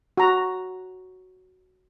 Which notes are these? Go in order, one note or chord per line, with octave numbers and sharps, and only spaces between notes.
F#4 A#5